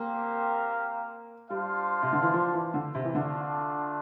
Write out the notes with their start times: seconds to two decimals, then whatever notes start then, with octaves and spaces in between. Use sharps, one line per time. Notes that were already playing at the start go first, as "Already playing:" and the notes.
Already playing: A#3 C4 G4 A#4 F5
1.50 G3 D4 F4 C5 F5
2.03 C3
2.13 D3
2.23 E3
2.33 F3
2.53 E3
2.74 D3
2.95 C3
3.05 E3
3.15 D3 A3 D4 F4